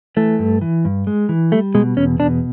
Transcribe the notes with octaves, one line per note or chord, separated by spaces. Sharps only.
E3 A3
G2
E3
G2
G#3
E3
G3 A3
B2 G#3
E2 C#4
B2 D4